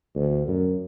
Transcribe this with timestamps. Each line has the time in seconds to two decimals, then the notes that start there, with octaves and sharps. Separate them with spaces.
0.15 D2
0.48 F#2